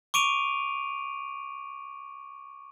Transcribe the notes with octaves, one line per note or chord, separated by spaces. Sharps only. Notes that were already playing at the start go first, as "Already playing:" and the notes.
C#6 D6 D7 D#7 F7